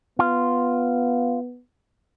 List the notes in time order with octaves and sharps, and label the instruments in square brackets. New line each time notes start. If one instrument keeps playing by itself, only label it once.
[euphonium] B3 [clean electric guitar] F4